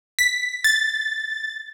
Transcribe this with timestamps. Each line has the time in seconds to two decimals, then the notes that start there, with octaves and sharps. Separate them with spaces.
0.19 B6
0.64 A6